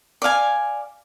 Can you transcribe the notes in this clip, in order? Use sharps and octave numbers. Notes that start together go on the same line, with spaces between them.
D5 F5 G#5